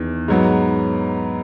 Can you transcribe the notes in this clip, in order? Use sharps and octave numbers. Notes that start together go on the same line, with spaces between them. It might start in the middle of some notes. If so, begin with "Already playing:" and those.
Already playing: E2 D#3
G#2 F#3 B3